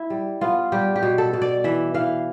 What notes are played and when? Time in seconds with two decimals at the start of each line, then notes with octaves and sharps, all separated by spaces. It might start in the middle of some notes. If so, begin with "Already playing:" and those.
Already playing: E4
0.10 G3
0.41 B3 F4
0.72 G3 G4
0.96 G4
1.03 B2
1.18 A4
1.33 B2
1.42 D5
1.64 E3 E5
1.94 E3 F5